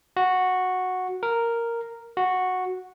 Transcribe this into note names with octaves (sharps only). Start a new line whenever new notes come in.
F#4
A#4
F#4